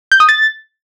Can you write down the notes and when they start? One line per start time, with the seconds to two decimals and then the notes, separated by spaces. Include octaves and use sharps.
0.12 G6
0.20 D#6
0.29 A6